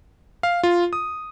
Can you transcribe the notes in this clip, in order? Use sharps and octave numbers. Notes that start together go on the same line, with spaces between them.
F5
F4
D#6